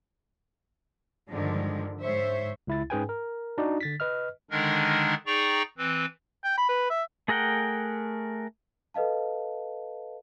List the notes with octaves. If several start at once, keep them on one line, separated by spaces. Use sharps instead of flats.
G2 D3 D#3 F3 G#3
G#2 C5 C#5 E5
C#2 E4 A6
G#2 C#4 G#4 B4 G5 G#5
A#4
D4 D#4 F#4 D5
D3 A6 B6
B4 D#5 F6
D3 D#3 G#3 D4 D#4 A#4
D#4 G#4 D5 G5 A#5 C#6
E3 C4 B4
G5
B5
B4
E5
A3 G#4 A#4 F#5 G5
A4 B4 D#5 F5 A5